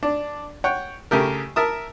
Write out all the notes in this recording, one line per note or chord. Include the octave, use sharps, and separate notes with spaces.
D4
C#5 F#5 G5
C#3 A3 G4 A#4
A#4 E5 A5 D#6